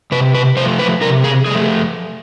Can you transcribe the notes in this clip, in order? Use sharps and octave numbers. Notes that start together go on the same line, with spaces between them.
C3 B4
B4
F3 A3 C5
B4
C3 A#4
G#4
F3 A3 G#4